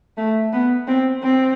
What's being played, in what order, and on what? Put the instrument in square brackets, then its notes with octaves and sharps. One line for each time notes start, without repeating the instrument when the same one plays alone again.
[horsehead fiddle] A3
B3
C4
C4